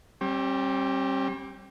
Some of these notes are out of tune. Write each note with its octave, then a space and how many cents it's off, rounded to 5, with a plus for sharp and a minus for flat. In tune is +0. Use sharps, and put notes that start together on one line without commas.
G3 -5 C4 +45